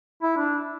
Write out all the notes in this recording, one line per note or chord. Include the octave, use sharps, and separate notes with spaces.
E4
D4